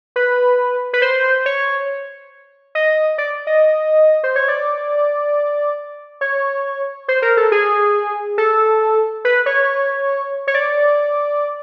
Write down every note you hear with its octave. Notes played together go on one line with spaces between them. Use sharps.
B4
B4
C5
C#5
D#5
D5
D#5
C5
C#5
D5
C#5
C5
A#4
A4
G#4
A4
B4
C#5
C#5
D5